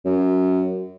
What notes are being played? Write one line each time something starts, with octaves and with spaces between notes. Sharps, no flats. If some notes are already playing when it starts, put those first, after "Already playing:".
F#2